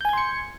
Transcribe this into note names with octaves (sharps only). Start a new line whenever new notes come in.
G#5 C6 G6 G#6 C#7